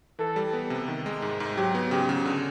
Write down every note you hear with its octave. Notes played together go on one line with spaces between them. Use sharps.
E3 A4
G3
B3
C3
D#3
G#3
G#2
G#2
F#3 G4
B3
C#3 G4
C#3
D3